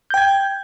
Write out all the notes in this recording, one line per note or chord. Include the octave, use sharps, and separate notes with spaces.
G5 G6 G#6